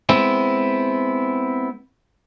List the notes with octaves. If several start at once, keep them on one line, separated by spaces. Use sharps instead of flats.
G#3 B3 C4 E4